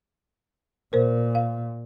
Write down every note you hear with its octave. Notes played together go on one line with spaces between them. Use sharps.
A#2 A#4 C5
F5